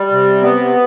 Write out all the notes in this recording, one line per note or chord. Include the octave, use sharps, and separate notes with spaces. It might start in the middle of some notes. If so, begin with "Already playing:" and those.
Already playing: G3
C3
B3